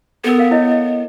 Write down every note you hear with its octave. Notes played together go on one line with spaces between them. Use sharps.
B3 A4 A#4
A#4 F5
E4 C#5 D#5
D#5